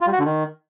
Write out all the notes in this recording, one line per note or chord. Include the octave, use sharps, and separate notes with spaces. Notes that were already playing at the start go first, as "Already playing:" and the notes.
F4
G3
F#4
D3
D#3